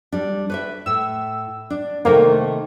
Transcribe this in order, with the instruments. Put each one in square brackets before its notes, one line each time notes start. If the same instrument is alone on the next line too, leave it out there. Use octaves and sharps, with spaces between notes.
[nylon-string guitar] G3 D4
B4 C#5 E5
[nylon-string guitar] A2 [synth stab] E6
[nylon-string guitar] D4
[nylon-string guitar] C3 D#3 A3 [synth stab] A#3